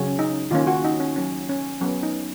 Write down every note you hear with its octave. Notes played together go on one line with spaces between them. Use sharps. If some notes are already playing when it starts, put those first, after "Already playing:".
Already playing: C#3 F#3 C#4
D#4
D#3 A#3 C#4 F4
F#4
D#4
C#4
F#3 C#4
C#4
F#3 B3 C#4
D#4